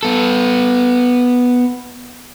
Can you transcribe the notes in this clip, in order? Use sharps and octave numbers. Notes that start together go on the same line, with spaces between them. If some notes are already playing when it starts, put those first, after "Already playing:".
B3 A4